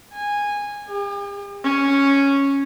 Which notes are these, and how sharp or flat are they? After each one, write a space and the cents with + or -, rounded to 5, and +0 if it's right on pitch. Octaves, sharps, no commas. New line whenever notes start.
G#5 -15
G4 +45
C#4 -5